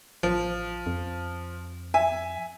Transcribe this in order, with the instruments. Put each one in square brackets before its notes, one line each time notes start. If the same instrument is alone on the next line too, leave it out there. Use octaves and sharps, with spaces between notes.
[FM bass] A1 [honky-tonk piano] F3
[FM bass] F2
[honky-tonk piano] E5 G#5